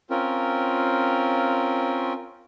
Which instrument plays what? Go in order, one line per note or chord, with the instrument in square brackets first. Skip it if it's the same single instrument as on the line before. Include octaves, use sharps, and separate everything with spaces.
[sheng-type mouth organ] C4 C#4 F4 A#4